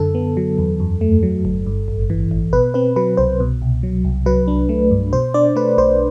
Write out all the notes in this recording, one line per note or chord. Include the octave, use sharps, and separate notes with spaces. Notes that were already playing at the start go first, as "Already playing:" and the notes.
Already playing: F#2 D3 A4
B3
F#3
E2
F#2
A3
F#3
G1
G2
A1
E3
A1
B2 B4
C4 B4
F#3 B4
C2 C5
B2
C2
F#3
C2
F#3 B4
D4
A3
G2
B2 C5
D4 D5
A3 B4
B1 C5